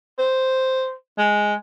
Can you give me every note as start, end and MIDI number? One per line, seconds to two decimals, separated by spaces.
0.19 0.92 72
1.18 1.54 56